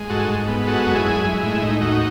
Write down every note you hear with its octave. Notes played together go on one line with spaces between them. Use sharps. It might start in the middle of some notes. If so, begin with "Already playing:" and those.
Already playing: G#3
G#2 F#4 A4
G#2
B3
G#3 F#4 A4
F#2
E4 G#4
G#3
G#3 E4
A2 E4
A2 D#4
D#2 D#4 F#4